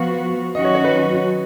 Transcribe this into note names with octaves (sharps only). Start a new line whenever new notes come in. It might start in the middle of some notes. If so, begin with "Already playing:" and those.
Already playing: F3 B3 F#4 F5
D#3 F#3 C#4 F#4 D#5
C#5
C#5
B4